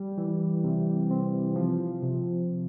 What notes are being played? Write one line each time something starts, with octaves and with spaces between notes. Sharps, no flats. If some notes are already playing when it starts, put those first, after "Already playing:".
Already playing: G3
E3
C3
C4
F3
C3